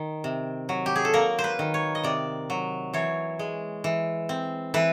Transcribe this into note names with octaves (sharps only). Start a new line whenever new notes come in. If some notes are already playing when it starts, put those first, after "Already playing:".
Already playing: D#3
C3
F#3
G4
G#4
A4
A#3 A#4
C5
B4
D#3
C#5
D#5
C3 D5
F#3
E3 C#5
G#3
E3
C4
E3 B4